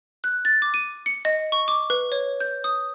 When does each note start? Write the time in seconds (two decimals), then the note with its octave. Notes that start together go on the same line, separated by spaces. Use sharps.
0.24 F#6
0.45 A6
0.62 D6
0.74 D#7
1.06 C#7
1.25 D#5
1.52 C#6
1.68 D6
1.90 B4
2.12 C#5
2.40 G6
2.64 D#6